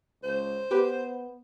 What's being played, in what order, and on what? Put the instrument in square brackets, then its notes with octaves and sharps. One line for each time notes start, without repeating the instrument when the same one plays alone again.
[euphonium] C#2 [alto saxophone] C5
[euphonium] B3 [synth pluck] G4 B4